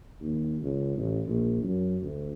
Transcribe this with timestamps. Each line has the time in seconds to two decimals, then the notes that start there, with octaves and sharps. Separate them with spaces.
0.21 D#2
0.62 C#2
0.98 A1
1.28 A#1
1.63 F#2
2.02 D2